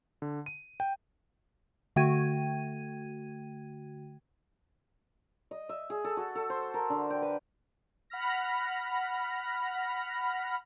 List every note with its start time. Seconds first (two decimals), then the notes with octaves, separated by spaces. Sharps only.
0.22 D3
0.46 D#7
0.80 G5
1.96 D3 A3 F#4 G5 G#6 D#7
5.51 D#5
5.69 E5
5.90 G#4
6.04 A4
6.17 F#4
6.35 A4
6.50 C5
6.74 A#4
6.90 D3
7.10 G5
7.22 B4
8.10 F#5 B5 F6 A#6